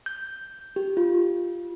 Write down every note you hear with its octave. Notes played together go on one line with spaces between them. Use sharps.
G6
G4
F4